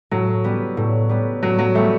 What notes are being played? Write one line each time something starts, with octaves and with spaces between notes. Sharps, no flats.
A2 F#3
G3 B3
A2
G3 B3
A2 F#3
F#3
G3 A3 B3